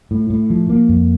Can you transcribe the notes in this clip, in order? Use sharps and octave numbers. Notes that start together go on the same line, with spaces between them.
A2
A2
F3
A#3
F2